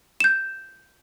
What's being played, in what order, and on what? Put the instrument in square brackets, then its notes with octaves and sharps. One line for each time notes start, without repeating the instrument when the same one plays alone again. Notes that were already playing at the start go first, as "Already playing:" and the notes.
[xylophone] G6 E7